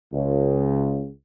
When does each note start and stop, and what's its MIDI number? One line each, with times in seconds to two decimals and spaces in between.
0.13 1.06 37